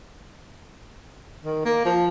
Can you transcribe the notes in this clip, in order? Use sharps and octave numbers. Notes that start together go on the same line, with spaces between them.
D#3
A#3
F3